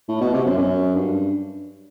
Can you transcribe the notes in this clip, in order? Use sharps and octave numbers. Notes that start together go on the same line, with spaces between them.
A2
B2
C3
F#2
F#2
G2